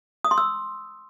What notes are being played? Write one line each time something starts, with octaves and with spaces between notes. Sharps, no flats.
D#6
C6
E6